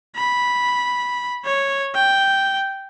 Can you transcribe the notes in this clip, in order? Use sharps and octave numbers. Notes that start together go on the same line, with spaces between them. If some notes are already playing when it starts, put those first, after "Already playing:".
B5
C#5
G5